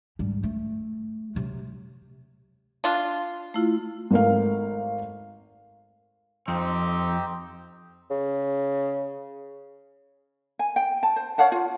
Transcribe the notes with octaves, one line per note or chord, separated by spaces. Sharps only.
G#2 G3
A3
C3 F#3
D4 F4
A3 E4 F4
G#1 A3 A#4 F5
F2 C4 D#4 G4
C#3
G#5
G5
A5
C5
C#5 F5 F#5 A5
F4